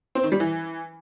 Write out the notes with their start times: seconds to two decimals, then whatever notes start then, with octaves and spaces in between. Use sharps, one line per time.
0.15 C4
0.24 D#3
0.32 G3
0.40 E3